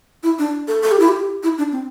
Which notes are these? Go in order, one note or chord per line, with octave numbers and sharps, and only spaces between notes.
E4
D4
A4
A4
G4
E4
G4
E4
D4
C4